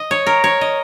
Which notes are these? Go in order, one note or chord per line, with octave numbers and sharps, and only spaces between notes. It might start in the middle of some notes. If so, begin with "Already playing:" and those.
Already playing: D#5
C#5
A#4
C#5
D#5